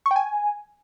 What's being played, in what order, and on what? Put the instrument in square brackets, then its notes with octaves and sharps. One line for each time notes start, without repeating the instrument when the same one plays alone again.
[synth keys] C#6
G5
G#5